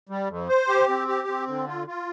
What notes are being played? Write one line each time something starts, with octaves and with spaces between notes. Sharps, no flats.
G3
F2
C5
G4
C4
G4
C4
D3
F4
F4